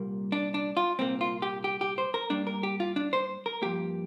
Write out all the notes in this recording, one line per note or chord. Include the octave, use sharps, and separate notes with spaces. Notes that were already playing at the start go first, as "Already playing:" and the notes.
Already playing: C2 A#2 G3 A#3
D4
D4
F4
C2 A#2 A#3 C4
F4
G4
G4
G4
C5
A#4
G2 G3 A#3 D4
A#4
G4
F4
D4
C5
A#4
G2 F3 A#3 G4